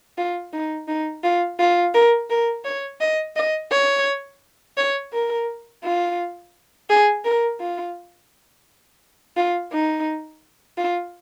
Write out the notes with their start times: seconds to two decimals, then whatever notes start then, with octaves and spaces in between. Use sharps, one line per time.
0.18 F4
0.53 D#4
0.88 D#4
1.23 F4
1.59 F4
1.94 A#4
2.30 A#4
2.64 C#5
3.00 D#5
3.36 D#5
3.71 C#5
4.77 C#5
5.13 A#4
5.84 F4
6.89 G#4
7.24 A#4
7.60 F4
9.36 F4
9.72 D#4
10.77 F4